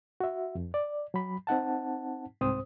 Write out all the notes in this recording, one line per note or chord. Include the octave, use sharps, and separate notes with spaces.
F#4 E5
F2
D5
F#3 B5
C4 D#4 F#5 A5
C2 G#2 C4 C5 D#6